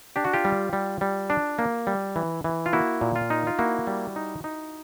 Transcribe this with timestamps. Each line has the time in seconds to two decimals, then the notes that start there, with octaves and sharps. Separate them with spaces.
0.16 D4 G4
0.25 F#4
0.33 F4 G4
0.45 G3
0.73 G3
1.01 G3
1.30 D4
1.59 A#3
1.87 G3
2.16 E3
2.44 E3
2.66 F4
2.73 A#3 E4 F#4
3.01 A#2
3.16 F4
3.30 D#4
3.47 F4
3.58 A#3 E4 F#4
3.87 G3
4.16 D#4
4.44 D#4